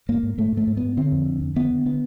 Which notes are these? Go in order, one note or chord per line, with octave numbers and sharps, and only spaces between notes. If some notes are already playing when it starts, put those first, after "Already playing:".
G#2 A#3
G#2
G#2 A3
G#2
A3
G#2
G#2 B3
D3 C4
F2
D3
F2
D3 B3
D3
D3 B3